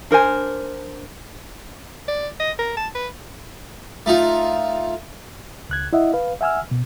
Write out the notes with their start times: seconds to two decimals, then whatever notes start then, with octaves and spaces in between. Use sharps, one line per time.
0.11 D4 A#4 C5 G#5
2.08 D5
2.40 D#5
2.59 A#4
2.77 A5
2.95 B4
4.06 A3 D#4 F4
5.69 C#2 F#6 G#6
5.93 E4 D#5 E5 F#5
6.13 B4 F5
6.41 E5 F#5 G#5 E6 F6
6.71 B2